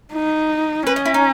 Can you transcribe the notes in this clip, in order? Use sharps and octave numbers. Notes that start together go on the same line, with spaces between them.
D#4
C#4 B4
D#5
E4
D#4